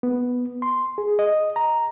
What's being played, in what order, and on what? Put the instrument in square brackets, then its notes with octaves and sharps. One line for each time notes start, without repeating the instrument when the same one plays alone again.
[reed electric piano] B3
C6
G#4
D#5
A#5